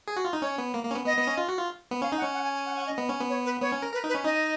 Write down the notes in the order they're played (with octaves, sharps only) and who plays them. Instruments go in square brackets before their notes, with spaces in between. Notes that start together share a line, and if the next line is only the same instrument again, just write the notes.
[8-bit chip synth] G#4
F#4
F4
D#4
[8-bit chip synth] C#4 [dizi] C#5
[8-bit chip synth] B3
A#3
A#3
C#4
B3
[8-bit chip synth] B3 [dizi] D#5
[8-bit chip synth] B3
C#4
F4
F#4
F4
B3
[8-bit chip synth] C#4 [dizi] F5
[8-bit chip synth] D#4
[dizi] F#5
[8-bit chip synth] C#4
[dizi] F#5
G#5
G#5
F#5
F#5
D#5
[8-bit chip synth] B3
C#4
B3
[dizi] C#5
B4
[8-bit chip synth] B3 [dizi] C#5
[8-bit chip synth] C#4
A#4
[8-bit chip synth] A#4 [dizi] B4
[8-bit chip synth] D#4
[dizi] B4
[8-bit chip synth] C#4
[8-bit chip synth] D#4 [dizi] D#5